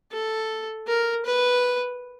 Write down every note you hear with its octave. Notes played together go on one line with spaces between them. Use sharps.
A4
A#4
B4